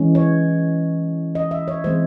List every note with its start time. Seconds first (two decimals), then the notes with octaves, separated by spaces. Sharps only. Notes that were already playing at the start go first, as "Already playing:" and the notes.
Already playing: E3 G#3 C#4
0.15 C#5
1.35 D#5
1.51 E5
1.68 C#5
1.84 E3 G#3 C4 C5